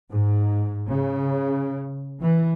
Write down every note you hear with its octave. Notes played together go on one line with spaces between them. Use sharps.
G#2
C#3
E3